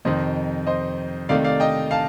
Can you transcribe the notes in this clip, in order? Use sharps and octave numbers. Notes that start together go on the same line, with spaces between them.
F2 C3 D#3 C5 D#5
C5 D#5
C3 D#3 A3 D5 F5
D5 F5
D#5 G5
F5 A5